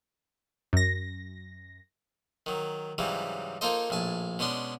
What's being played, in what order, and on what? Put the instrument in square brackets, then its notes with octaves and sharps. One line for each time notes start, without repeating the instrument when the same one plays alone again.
[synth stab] F#2 A#6
[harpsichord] D#3 F#3
G#2 C#3 E3 F#3 G3
A#3 D#4 F4 A4 C5 D#5
A#1 A2 G#5 A5
B2 G#3 C#4 D4 C6